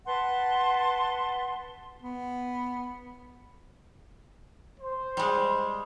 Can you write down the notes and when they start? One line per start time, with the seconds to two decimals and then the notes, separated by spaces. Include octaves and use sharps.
0.06 B4 F#5 A5 C6
2.02 B3
4.80 C5
5.17 G3 G#3